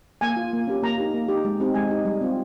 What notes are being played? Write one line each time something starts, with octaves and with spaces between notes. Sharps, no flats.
A#3 G#5
F4
A#3
C#4 G4
A#3 A#5
D#4 G4
A#3
D#4 G4
G#3
C4 D#4 G4
G#3 G#5
D#4 G4
G3
C4 F4